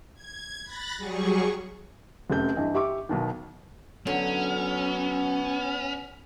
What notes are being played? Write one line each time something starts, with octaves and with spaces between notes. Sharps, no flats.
G#6
B5 F#6 A6 A#6
F#3 G3 G#4 C#6
F1 F#2 A3 G6
G2 E3 D#5
G4 E5 C#6 D6
B1 B2 D#3
D3 F#3 B3 C#4